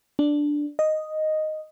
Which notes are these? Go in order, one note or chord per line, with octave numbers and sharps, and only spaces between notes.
D4
D#5